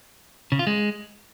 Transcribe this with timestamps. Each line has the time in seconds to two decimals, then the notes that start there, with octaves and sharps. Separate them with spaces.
0.52 C#3
0.59 F4
0.67 G#3